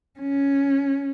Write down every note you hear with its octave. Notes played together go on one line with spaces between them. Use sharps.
C#4